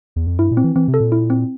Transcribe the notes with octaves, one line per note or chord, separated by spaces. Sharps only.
E2
F2
G2 E4
A#2
C4
E3
E3 C4
C3
A4
A#2
E4
C4